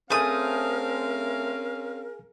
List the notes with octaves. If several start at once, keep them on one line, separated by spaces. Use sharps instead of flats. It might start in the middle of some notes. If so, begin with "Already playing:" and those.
A3 C4 C#4 G#4 A#4 F5 G#5 D#6